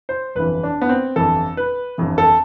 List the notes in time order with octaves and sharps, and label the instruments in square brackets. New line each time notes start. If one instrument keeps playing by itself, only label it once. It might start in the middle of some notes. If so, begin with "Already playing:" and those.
[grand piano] C5
G1 F2 E3 B4
D4
B3
C4
G1 F2 E3 A4
B4
G1 F2 E3
A4